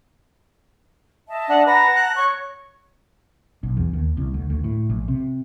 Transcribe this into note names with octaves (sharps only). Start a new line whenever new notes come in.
D#5 E5 A5
D4 F#5
B4 F#5 A5 A#5 A#6
F#6
C#5 C#6
B1
E2
D#2
C2
D2
D2
A2
A#1
C3